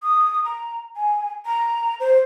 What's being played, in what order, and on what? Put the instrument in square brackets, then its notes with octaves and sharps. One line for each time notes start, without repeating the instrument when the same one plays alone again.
[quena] D#6
A#5
G#5
A#5
C5